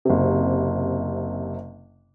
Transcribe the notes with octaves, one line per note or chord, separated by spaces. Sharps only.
F#1 C3